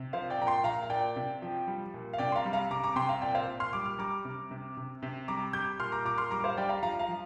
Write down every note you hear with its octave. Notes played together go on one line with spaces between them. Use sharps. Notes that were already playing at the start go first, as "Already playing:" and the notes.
Already playing: C3
F3 C5 F5
D5 G5
A#2 A#5
G5 C6
A#2 F5 A#5
F5
A#2 D5 G5
C3
F3
G3
A#2
F5
C3 D5 G5
C6
F5 A#5
G3
F5 A#5
C3 A#5 D6
A#5 D6
C3 G5 C6
F5 A#5
A#2 D5 G5
C5 F5
A#2
C6 F6
G3 D6
F6
G3 A#5 D6
C3
C3
C3
C3
G3 A#5 D6
G3 D6 G6
A#2 C6 F6
A#5 D6
A#2 A#5 D6
C6 F6
G3 A#5 D6
C5 F5
G3 D5 G5
F5 A#5
F3 F5 A#5
F5 A#5
F3